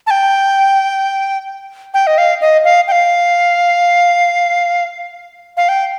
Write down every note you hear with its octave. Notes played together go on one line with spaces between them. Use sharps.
A5
G5
G5
D#5
F5
D#5
F5
G5
F5
F5
G5